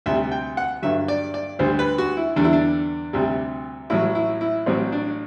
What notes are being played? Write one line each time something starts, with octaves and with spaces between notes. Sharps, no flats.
D2 C3 G3 E5
G5
F#5
G2 D3 F#3 E5
D5
D5
D2 D3 G3 C5
B4
F#4
E4
E2 D3 G3 D4
E4
D4
D2 C3 G3
A1 A2 F#3 E4
E4
E4
A1 A2 F#3 C4
D4